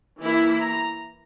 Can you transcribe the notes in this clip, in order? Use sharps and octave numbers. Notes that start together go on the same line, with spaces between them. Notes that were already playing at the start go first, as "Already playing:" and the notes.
E3 A#3 E4
A#5